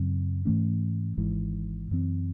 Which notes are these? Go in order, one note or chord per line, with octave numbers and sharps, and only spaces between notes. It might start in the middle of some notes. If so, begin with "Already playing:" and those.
Already playing: F#2 C#3 F#3 C4
G#2 E3 A3 C#4
G#1 G#2 E3
F#2 E3 C4